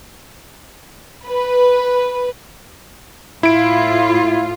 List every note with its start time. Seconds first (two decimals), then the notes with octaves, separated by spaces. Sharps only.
1.26 B4
3.43 A2 E4 F4 D7